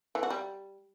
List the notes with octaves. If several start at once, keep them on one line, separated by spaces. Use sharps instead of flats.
E3
F#4
G3